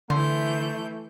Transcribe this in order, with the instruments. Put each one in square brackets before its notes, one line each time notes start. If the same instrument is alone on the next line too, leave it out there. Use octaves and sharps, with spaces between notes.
[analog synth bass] D3 [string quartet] E3 G6 [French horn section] A3 [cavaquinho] C5